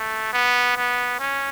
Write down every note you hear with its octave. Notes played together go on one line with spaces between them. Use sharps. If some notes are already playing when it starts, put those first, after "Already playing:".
Already playing: A3
B3
B3
C#4